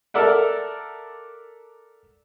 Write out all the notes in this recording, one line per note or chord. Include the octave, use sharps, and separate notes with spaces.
A4 A#4 D5 E5 F#5